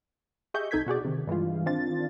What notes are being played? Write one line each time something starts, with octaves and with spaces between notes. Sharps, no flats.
G4 G#4 D#5 E5 C#6 G6
C2 D#4 A4 G6 G#6 B6
B2 F#4 G#4 D5
C3 D#3
G2 E3 G#3 F4
D#3 C4 D4 F4 A6